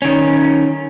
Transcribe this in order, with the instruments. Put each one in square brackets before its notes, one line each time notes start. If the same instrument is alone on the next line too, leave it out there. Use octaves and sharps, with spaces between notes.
[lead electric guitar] D#3 C#4